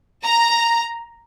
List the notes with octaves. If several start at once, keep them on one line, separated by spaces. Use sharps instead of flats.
A#5